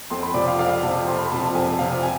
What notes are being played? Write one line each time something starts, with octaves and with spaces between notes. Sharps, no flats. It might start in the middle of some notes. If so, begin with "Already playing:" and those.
F2 C6
B5
C3 F3 D5
F5
F2 F5
C3 F3 A5
F2 C6
B5
C3 F3 A5
A5
F2 G#5
C3 F3 F5
G#5